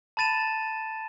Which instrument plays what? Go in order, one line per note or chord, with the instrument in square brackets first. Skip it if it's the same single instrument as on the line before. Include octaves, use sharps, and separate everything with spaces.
[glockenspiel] A5 B5 A6 D#7 E7